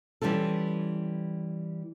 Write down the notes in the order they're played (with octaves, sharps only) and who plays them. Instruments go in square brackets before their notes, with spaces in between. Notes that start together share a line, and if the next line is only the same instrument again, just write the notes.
[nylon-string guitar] E3 G3 C#4 F4 A4